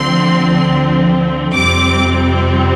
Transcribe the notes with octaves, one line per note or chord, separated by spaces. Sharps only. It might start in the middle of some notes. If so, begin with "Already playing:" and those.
Already playing: D2 D3 F3 C4 C6
F2 C3 G3 C4 D6